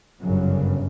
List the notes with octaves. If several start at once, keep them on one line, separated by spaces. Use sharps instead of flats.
G1 F#2 C#3 F#3